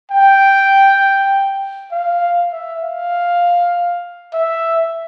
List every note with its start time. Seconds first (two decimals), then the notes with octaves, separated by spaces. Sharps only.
0.11 G5
1.92 F5
2.53 E5
2.83 F5
4.33 E5